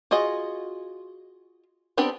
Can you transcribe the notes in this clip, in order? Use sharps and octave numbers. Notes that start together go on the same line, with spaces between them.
F4 F#4 G#4 D#5
B3 C4 D4 G4 B4